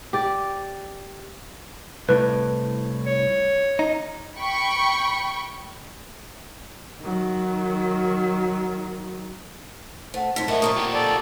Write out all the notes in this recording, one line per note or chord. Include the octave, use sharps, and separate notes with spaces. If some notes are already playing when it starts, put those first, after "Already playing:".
G4 D5
C2 A2 B4
C#5
D#4
G5 B5 C#6
D#3 F#3
A3 C5 F#5
F2 G#2 B6
A2 A#4 D#5 E5 F#5
F2 A#2 A#3 A#5 C#6 D#6
F4 G4
A4 D5